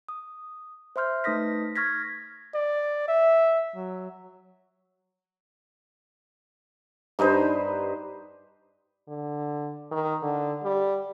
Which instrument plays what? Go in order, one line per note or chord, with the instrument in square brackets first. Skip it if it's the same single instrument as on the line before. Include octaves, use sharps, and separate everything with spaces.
[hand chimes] D#6
C5 E5 C6 F6 G6
A3 D#4 B4 D#6 A#6 B6
C#6 F6 G#6 A#6 B6
[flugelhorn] D5
E5
F#3
[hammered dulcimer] G2 D#4 B4 C5
[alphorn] D3
D#3
D3
G3